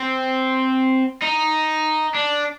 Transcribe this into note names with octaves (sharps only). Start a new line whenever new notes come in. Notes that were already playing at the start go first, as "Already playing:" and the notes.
Already playing: C4
D#4
D4